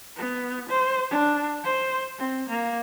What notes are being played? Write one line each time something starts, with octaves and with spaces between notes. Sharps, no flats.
B3
C5
D4
C5
C4
A#3